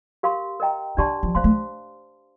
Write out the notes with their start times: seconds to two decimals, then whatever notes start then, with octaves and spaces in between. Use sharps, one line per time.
0.23 G4 A#4 F5 C6
0.60 A#4 D#5 G5 A#5
0.97 D3 D4 G4 D5 A5 C6
1.23 F3
1.35 A#3 C5 F5 C6
1.44 A3